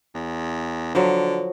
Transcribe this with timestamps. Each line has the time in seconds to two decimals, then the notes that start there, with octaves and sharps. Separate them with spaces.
0.15 E2
0.95 D3 F3 F#3